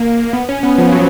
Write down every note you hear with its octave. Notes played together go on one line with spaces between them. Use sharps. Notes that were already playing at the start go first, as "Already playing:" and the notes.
Already playing: A#3
B3
C#4
B3
F3
F#3